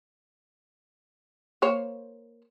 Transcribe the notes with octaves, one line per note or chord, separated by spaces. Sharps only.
A#3 C5 C#5